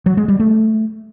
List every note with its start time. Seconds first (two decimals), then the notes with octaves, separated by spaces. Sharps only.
0.06 F#3
0.17 G#3
0.28 G3
0.40 A3